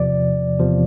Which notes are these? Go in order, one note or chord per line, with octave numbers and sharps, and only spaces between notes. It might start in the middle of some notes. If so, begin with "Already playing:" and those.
Already playing: E2 C3 F3 D5
E2 C3 F3